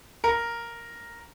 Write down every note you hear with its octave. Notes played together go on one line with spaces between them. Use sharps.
A#4